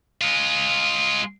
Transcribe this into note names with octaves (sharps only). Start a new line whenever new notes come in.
G#3 F4